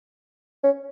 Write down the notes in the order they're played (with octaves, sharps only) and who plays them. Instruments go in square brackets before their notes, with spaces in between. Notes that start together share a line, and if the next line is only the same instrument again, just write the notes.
[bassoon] C#4